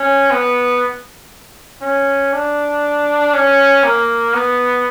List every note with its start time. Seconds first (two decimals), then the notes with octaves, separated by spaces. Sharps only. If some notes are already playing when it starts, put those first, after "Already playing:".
Already playing: C#4
0.31 B3
1.82 C#4
2.33 D4
3.33 C#4
3.84 A#3
4.34 B3